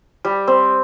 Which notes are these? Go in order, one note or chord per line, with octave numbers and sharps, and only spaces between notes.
G3
C4